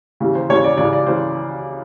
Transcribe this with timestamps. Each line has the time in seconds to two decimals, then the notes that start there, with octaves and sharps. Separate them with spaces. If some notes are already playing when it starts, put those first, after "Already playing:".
0.20 D#2 C#3 E3
0.35 C5
0.49 D#2 C#3 E3 C#5
0.64 D5
0.77 C#2 C#3 E3 D5
0.93 D5
1.06 C#3 E3 C5